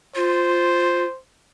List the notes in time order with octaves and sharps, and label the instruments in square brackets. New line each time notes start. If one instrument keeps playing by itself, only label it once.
[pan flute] F4 [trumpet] C5